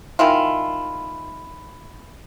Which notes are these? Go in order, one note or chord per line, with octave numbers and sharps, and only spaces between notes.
D#3 G#3 E4 F4